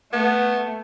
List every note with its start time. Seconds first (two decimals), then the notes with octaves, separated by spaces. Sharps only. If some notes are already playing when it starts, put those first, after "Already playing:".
0.13 A3 B3